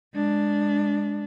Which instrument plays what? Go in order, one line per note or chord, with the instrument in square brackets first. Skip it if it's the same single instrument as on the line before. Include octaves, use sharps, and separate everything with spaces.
[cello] G#3 D4